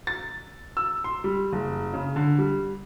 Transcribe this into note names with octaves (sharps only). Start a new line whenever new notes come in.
A6
E6
C6
G3
F#1
C#3
D3
G3